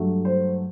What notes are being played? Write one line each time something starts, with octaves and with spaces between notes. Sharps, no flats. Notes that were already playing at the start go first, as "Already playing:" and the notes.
Already playing: G2 F#3 A3
C5